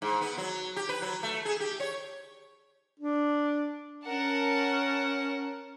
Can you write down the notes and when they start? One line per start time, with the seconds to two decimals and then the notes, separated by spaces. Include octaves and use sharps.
0.02 G#2
0.21 B3
0.38 F#3
0.76 G4
0.89 B4
1.02 F#3
1.23 A3
1.45 G#4
1.60 G4
1.80 C#5
3.00 D4
4.05 C#4 A#4 F#5 A5